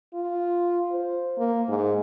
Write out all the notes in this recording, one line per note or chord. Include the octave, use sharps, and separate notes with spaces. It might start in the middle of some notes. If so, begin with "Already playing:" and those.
F4
C5
A#3
G#2